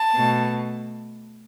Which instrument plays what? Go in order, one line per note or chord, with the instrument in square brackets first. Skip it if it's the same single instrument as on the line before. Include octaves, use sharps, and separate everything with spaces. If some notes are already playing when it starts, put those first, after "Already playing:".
Already playing: [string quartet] A5
B2 A3